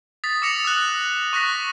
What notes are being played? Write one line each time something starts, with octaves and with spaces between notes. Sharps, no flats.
D#6 A6 B6
D6 E6 A#6 C#7 E7 F7
E6 F#6
C#6 F#6 A#6 B6